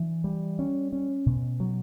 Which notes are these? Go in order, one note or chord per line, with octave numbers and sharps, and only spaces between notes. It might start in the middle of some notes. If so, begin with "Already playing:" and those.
Already playing: E3 D4
G3
C#4
C#4
B2
F#3